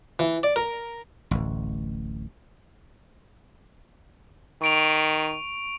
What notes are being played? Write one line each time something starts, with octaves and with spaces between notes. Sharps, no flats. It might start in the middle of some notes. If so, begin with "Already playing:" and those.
E3
D5
A#4
D1 A1
D#3 C#6 D7 F7